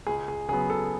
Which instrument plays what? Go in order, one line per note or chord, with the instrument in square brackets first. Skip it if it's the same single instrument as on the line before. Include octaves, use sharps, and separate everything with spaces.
[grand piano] C#2 G#4
G#4
C#3 F#3 B3 G#4
A4